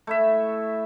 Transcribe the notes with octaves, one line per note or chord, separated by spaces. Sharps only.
A3 E4 E5